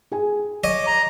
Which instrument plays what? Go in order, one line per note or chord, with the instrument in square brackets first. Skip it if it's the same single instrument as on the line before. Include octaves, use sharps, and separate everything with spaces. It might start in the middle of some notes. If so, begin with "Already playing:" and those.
[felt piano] G#4 G#5
[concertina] C#5 D6 [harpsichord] D#5
[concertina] A#5